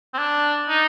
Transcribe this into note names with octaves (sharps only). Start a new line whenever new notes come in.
C4
D4
D#4